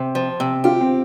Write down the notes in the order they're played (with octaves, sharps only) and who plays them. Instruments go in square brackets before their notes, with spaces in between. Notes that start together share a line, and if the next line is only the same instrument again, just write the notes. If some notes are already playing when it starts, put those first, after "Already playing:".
Already playing: [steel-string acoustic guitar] C3
F3
C3
[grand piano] F4 [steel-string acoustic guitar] G4
[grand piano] C4